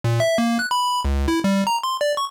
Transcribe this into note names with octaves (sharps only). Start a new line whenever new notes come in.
A#2
E5
A#3
F#6
B5
C#2
E4
G3
A#5
C6
D5
C#6